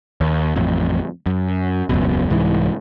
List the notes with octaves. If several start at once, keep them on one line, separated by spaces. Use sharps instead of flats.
D#2
A1 F2
F#2
E1 C#2 F#2 B2
C2 G#2 E3